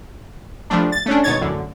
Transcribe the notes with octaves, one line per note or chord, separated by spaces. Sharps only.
F3 G3 A3 D4
A6
A3 C#4 D4
G#1 B2 D#4 C#5 G#6 A6
A1 F#2 D3